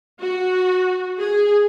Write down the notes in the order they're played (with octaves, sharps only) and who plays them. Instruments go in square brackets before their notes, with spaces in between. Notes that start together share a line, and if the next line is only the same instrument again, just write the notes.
[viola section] F#4
G#4